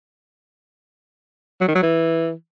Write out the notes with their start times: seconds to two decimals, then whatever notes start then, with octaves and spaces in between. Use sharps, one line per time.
1.61 F#3
1.68 D#3
1.75 F#3
1.83 E3